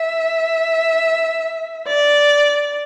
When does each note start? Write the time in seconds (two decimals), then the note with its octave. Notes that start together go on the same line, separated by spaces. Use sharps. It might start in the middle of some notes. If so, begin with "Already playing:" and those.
Already playing: E5
1.88 D5